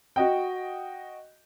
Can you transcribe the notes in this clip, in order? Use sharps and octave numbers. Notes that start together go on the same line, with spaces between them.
F#4 D#5 G5